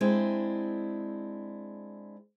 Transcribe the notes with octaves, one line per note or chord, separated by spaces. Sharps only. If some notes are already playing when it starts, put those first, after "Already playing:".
G#3 C4 D4 E4